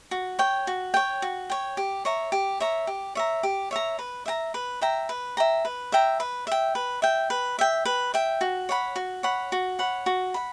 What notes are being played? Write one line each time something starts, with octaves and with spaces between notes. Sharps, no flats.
F#4
C#5 G5
F#4
C#5 G5
F#4
C#5 G5
G4
C#5 E5 A#5
G4
C#5 E5 A#5
G4
C#5 E5 A#5
G4
C#5 E5 A#5
B4
E5 G5 A#5
B4
E5 G5 A#5
B4
E5 G5 A#5
B4
E5 G5 A#5
B4
E5 G5
B4
E5 G5
B4
E5 G5
B4
E5 G5
F#4
C#5 F#5 B5
F#4
C#5 F#5 B5
F#4
C#5 F#5 B5
F#4
F#5 B5